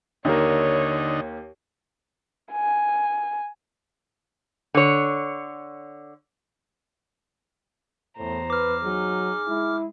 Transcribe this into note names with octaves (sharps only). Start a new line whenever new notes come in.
D#2 D3 A#3 D#4 C#5
G#5
D3 C#5
E2 A2 C5 A#5
B4 D6 F6
F#3 D#4 G#4
G#3 E4